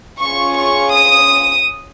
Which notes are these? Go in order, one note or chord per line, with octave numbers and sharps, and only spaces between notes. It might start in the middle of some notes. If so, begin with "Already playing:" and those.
C#4 F4 G#4 C#6
C#6
D#6